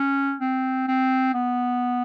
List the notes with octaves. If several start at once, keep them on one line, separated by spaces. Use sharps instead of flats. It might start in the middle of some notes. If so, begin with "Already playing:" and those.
Already playing: C#4
C4
C4
B3